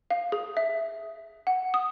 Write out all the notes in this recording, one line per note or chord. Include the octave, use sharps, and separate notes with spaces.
F5
G#4
E5
F#5
D#6